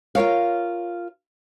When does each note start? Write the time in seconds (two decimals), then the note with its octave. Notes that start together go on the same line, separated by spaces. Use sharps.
0.15 F4 A#4 C#5 F5